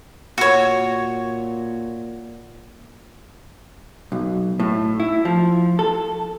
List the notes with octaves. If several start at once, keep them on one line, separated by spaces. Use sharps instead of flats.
A#2 F#4 C#5
B1
A2
E4
F3
A4